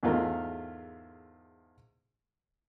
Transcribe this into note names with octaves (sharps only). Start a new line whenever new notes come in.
E2 G#2 A3 F4 A#4